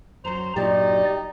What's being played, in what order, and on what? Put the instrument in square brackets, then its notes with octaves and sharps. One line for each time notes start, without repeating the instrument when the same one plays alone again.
[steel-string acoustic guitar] F#2 F#3 [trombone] C5 [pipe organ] A#5
[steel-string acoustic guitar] G2 A#2 F#3 [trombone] D#4 [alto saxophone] G4 [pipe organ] D5